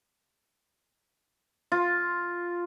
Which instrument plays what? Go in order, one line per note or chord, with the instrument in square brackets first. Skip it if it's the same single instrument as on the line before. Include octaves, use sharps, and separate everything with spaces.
[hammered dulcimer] F4